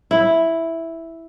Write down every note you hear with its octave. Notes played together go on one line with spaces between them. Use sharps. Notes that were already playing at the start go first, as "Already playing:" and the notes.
E4